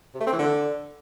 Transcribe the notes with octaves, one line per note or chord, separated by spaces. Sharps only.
C3
A3
C4
E3
D3